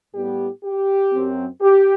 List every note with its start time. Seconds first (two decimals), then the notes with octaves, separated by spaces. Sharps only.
0.15 A2 G3 B3 G4
0.63 G4
1.13 F#2 F#3 C4
1.61 G4